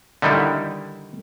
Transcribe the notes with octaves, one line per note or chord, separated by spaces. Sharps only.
D3 D#3 G3 D#4 E4